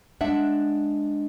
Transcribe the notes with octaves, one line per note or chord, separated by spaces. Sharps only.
G#3 D4 E5 F#5